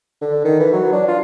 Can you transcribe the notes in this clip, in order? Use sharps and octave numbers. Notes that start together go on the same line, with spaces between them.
D3
D#3
E3
F#3
D4
F4